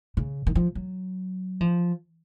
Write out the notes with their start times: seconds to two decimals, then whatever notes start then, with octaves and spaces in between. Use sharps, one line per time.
0.17 C#3
0.47 D#3
0.55 F3
0.75 F#3
1.61 F3